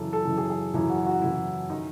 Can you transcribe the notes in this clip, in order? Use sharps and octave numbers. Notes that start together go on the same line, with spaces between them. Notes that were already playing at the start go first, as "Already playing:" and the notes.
Already playing: F#2 C#3 E3 A4
A4
F#2 C#3 E3
G#4
G#4
F#2 C#3 E3 E4
F#4
F#4
F#2 C#3 E3 E4
D#3 D#4